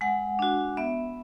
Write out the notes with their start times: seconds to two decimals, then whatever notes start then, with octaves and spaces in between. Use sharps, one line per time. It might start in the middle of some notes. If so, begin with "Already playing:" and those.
0.01 G#3 F#5
0.39 D4 F#4
0.77 B3 E5